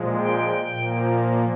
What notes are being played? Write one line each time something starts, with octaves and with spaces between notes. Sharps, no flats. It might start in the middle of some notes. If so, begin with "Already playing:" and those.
Already playing: A#2 F3 G#3
G5
A#2 F3 A#3